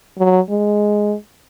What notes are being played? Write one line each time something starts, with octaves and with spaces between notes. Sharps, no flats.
F#3
G#3